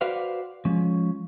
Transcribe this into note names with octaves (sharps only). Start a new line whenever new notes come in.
F#4 B4 C5 D5 F5 F#5
F3 G#3 C#4